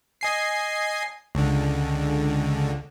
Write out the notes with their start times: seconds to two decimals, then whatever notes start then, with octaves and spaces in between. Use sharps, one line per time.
0.21 D#5 G#5 C7
1.35 C#2 D3